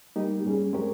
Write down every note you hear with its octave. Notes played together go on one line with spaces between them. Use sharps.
G3 A#3 D#4 G4
G2 G3 C#4 G#4
G#3 C4 G4 A#4 C#5